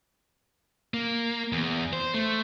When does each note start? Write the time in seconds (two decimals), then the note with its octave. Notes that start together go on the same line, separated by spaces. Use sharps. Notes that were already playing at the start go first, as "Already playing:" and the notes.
0.94 A#3
1.52 E2
1.93 C5
2.14 A3